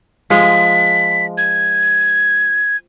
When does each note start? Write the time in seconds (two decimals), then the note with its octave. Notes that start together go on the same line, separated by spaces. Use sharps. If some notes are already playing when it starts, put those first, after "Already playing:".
0.30 F3 G#3 B6
1.38 G#6